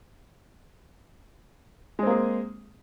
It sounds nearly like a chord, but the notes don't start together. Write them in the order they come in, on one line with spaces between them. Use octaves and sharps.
G#3 C4 A#3 G#4